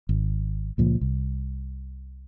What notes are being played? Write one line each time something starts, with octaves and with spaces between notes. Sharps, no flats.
G#1
C#2 A#2 F3
C2